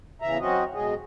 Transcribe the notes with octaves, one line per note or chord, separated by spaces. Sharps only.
E2 C#3 E3 E5 A#5
F#3 C4 C#4 F#4 D#5
B2 F#3 G#3 G#4 D#5